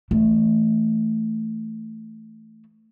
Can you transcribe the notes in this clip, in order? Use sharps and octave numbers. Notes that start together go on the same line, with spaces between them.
E3 A3